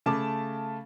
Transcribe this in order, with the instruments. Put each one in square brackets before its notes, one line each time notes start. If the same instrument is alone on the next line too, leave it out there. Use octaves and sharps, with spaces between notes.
[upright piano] C#3 A3 A5 D6